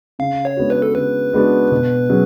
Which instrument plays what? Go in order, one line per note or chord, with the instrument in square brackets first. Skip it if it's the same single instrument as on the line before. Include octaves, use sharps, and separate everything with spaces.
[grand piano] C#3 [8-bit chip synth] F5
[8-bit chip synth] C#5
[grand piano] G#3 B3 D4 F#4
[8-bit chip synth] B4
A4
[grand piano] C#3 [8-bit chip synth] B4
[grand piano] G#3 B3 D4 F#4
B2
F#3 C#4 G#4